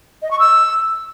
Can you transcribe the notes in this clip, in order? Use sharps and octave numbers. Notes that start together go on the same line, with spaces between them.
D#5
C#6
E6